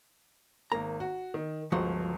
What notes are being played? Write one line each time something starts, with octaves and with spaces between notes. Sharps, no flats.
G#1 A#3 A#5
F#4
D#3
G1 C#2 F3 F#4